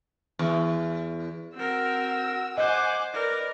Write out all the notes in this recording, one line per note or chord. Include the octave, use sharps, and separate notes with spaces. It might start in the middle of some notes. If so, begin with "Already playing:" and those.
E2
C4 F#4 A#4 E6
C5 D#5 F#5 G#5 D6
A#4 B4 D5